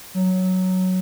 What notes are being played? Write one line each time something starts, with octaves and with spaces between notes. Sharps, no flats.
F#3